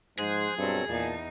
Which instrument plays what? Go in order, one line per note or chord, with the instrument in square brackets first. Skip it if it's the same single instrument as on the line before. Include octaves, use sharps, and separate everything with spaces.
[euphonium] G#2 [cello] F3 [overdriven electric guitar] G#4 [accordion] C5 G#5 F#6
[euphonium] G2 [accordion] B2 F#3 C4 [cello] A4 A#4
[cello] E2 D#4 [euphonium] A#2 [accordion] A5